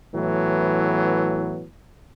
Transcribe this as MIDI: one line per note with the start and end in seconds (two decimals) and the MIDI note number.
0.14 1.66 45
0.14 1.66 52
0.14 1.66 54
0.14 1.66 59